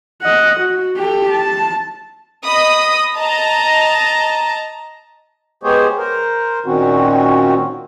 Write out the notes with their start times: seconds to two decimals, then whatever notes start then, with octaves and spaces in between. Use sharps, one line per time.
0.22 D#5 F#5
0.60 F#4
0.98 G4 A4
1.30 A5
2.45 D#5 B5 D#6
3.19 D#5 A5 A#5
5.63 G#3 B3 G4 G#4 C5 C#5
5.97 A#4 C5
6.66 A#2 D#3 C4 C#4 F#4